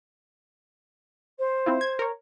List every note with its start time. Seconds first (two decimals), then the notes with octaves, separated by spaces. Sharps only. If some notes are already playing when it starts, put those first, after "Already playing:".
1.39 C5
1.66 C4 E4 F4
1.81 G#6
1.99 A#4 C#5